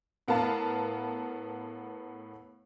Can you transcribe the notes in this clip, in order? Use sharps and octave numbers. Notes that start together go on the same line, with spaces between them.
A2 B3 A#4 F5 A5 B5